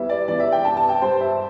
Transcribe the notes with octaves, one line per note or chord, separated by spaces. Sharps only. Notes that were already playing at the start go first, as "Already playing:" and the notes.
Already playing: E2 E3 G3 E5
D5
E2 E3 G3 D5
E5
G5
G2 G3 A5
A5
G5
G2 G3 C5
E5